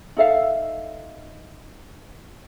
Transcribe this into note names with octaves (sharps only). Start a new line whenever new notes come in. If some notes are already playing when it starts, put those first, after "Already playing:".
D#4 A4 E5 F5